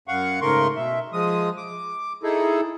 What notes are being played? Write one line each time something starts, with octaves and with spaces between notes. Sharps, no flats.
F#2 F5 F#5 C#6
G#2 C#3 A3 A#4 C6 C#6
B2 E5
F3 G#3 D#6
D6
D#4 E4 G#4 A4